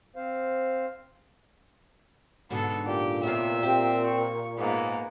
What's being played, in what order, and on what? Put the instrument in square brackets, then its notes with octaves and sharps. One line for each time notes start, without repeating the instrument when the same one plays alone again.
[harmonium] C4 C5 F5
[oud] G#2 B2 D3 [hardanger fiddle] B3 A4
[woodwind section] A#2 [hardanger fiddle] G4
[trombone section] A2 C3 [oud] B3 F5 [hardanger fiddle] E5
[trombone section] C4 [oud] G4
[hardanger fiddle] C#6
[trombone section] G#2 [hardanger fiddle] A#3 B3